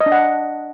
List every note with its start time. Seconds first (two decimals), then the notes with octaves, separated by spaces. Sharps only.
0.01 D#5
0.06 D4
0.12 F#5